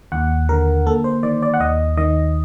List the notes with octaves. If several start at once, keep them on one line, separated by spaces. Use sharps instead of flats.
D#2 F#5
D3 A#4
A#3 A4
C5
D#3 D5
D5
F#5
D#2 D#5
D#3 D#5